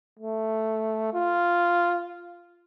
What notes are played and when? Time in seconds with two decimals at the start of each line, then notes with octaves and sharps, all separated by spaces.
0.19 A3
1.13 F4